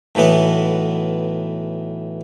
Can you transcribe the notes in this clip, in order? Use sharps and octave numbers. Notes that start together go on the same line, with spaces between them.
B1 A2 E3 B3 F#5